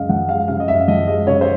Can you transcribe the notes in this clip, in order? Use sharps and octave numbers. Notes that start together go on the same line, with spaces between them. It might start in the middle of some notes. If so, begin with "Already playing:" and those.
Already playing: F#2 C#3 G#3 D#5 F5
F3 F#5
G#3 F5
C#3 F5
D#5
F#2 E5
F3 D#5
G#3 D#5
C#3 C#5
C5